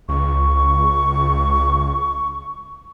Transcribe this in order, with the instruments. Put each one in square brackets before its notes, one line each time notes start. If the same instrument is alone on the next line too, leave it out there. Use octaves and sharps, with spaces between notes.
[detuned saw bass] C#2 [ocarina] C#6